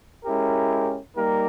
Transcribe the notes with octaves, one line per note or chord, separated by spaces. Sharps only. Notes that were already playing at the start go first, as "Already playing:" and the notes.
G#3 C#4 E4 G4 A#4
G3 A#3 D#4 G4 A#4